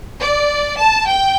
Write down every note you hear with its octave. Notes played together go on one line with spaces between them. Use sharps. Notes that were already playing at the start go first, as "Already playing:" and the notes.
D5
A5
G5